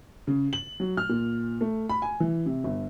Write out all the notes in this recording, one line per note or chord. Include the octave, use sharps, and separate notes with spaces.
C#3
F#7
F#3
F6
A#2
A3
B5
G#5
E3
C3
G1